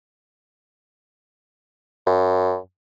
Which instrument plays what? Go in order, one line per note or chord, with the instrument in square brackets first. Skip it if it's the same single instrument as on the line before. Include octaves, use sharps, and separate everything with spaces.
[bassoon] F#2